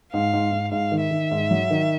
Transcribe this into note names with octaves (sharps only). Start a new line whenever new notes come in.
G#2 F5
G#2
G#2
G#2 F5
D#3
E5
D#3
G#2
F#3
D#3